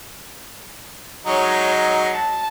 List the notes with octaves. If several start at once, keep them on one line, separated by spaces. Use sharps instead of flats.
F#3 G#3 D#4 C#5
A5